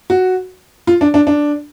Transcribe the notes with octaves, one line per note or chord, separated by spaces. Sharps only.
F#4
F4
D4
D4
D4